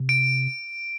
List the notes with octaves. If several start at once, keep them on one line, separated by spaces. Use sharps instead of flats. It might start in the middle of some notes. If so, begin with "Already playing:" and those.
Already playing: C3
D7